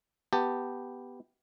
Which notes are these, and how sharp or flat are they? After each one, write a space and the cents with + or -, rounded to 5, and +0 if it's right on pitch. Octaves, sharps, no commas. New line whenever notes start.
B3 +0 G4 +0 A5 +15